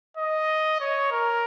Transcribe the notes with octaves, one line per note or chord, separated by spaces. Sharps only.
D#5
C#5
A#4